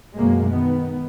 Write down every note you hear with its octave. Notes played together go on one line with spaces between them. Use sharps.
F#2 B2 F#3 G#3 A#3
D#3 B3